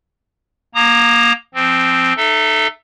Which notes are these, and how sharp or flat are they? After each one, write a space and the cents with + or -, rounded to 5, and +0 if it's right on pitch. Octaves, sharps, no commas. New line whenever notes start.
A#3 +15 A#5 -10 D#6 -25
F3 -15 C4 +0
D#4 -35 A4 +0 E5 +0